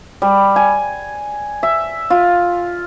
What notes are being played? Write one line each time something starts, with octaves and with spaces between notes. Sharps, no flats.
G3
G#5
E5
F4